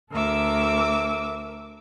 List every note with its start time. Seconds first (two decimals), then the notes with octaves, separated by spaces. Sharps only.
0.11 D2 A4 A#4 E5 D6 E6